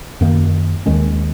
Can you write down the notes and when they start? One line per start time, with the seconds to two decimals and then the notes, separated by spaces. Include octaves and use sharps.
0.21 F#2 D#3 A#3
0.86 D#2 D#3 G#3 C#4